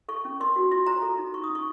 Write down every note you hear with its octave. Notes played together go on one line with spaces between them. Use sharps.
A4 C#6
C#4
A#4 C6
F#4
F4 C6
C5 A#5
A4
D#4
F4 C#6
D#6
C#4
C#6